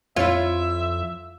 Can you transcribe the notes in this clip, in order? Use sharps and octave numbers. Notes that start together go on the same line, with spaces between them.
F2 E4 F4 C#5 E5